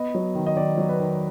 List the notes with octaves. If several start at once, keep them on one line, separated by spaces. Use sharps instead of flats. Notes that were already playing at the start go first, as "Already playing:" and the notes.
Already playing: B3 D#5
F#3
D#3
D#5
D#3 D5
F#3
B4
D#3